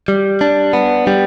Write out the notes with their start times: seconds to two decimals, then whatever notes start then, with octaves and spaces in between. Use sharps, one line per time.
0.08 G3
0.41 D4
0.73 B3
1.07 G3